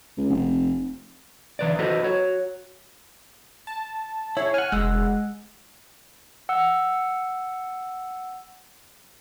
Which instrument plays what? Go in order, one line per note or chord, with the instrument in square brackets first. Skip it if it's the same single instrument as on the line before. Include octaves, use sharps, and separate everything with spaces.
[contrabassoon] C#2
F1
[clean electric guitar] D2 E3 B4 D5
F#4 A4 B4 C5 D#5
F#4 C#5
[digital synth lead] A5
[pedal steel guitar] E4 G#4 [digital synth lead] C#5
[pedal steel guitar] F#5 G#5 [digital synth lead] F6
[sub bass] F1 [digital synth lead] G#3 [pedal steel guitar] F#5 E6 F#6
[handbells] F#5 E6